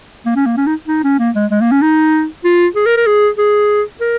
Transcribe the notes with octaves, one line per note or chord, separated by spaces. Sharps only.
A#3
C#4
A#3
C#4
D#4
D#4
C#4
A#3
G#3
G#3
A#3
C#4
D#4
F4
G#4
A#4
A#4
G#4
G#4
A#4